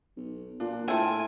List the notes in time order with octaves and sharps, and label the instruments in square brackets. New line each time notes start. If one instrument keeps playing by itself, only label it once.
[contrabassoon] B1
[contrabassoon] A#2 [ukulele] D4
[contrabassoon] A2 [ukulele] F4 G5 [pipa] A4 E5 [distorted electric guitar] G#5